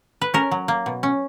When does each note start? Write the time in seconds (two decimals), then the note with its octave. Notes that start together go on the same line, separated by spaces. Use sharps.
0.22 B4
0.34 C#4 A#4
0.51 F#3
0.68 A#3
0.86 B2
1.03 C#4